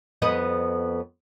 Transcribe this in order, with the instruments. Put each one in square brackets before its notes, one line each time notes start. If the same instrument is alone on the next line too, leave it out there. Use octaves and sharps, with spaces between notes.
[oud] F2 B3 D#5